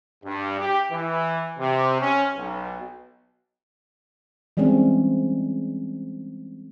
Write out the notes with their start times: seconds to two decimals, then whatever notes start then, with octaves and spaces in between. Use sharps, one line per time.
0.24 G2
0.59 G4
0.92 E3
1.59 C3
2.00 C#4
2.36 B1
4.57 E3 G3 G#3 C4 C#4